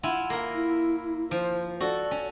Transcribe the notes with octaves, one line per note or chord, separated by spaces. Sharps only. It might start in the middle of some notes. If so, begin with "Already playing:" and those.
E4 F4 F#5 G#5
A#3 A#4
E4
F3 C5
F#4 A4 D5
C#4